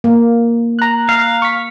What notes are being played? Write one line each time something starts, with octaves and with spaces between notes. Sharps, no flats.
A#3
A#5 F#6
F5
C#6 B6